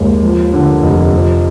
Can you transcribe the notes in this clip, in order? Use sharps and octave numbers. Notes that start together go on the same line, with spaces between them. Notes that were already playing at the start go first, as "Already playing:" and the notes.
Already playing: D#2 G#3
F3
D3
F1
F3